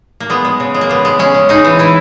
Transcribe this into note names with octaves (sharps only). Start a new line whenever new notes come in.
A#3
G#3 B3
G#3
C#3
G#3
A#3
C#3 B3
G#3
G#3 C#4
G#3
G#3 D#4
E3
E3 E4